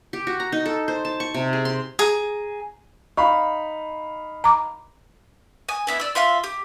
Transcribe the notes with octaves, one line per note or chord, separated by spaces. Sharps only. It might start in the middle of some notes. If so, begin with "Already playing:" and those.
G4
F#4
A#5
D#4
A4
C5
A5
C#6
C3
G#4
C6
G#4 A#5
D#4 F5 B5 C#6
A#5 D6
G#5 D#6
B3 E4 E5
D5 E6
F4 E5 F5 C6
G4